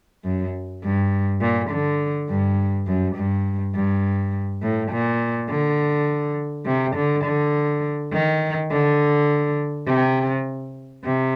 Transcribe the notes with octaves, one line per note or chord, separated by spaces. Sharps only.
F#2
G2
A#2
D3
G2
F#2
G2
G2
A2
A#2
D3
C3
D3
D3
D#3
D3
C3
C3